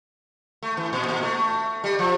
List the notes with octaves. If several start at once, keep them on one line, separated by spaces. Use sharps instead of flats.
A3
E3
A#2
A#2
A3
G3
F3